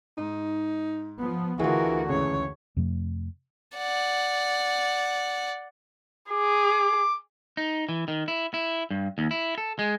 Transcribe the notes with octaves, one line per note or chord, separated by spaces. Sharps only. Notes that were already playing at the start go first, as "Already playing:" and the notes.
G#2 D#4
F3 B3
D2 D3 E3 F4 F#4 G#4 A#4
C#2 F#2 E3 G#4 C#5
F2 C3 F3 A3
D5 F#5
G#4 D6
D#4
E3
D#3
E4
E4
G2
D#2
E4
A4
G#3